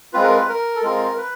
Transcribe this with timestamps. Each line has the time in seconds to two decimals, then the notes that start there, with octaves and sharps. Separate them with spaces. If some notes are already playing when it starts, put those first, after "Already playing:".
0.13 G#3 C4 F4 B4
0.23 A#4
0.31 B4
0.49 A#4
0.75 A4
0.83 G#3 C4 F4 A#4
1.18 B4